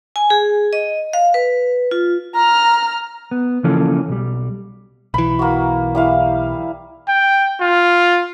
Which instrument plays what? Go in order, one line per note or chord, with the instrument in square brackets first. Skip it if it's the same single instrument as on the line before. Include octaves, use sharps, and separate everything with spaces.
[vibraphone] G#5
G#4
D#5
F5
B4
F4
[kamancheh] A#5 F6
[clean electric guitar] B3
C#3 E3 F3 A#3 C#4 A4
B1 G3
[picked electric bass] B1 E3 [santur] B5
[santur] A#3 F#4
G3 E4 F5
[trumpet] G5
F4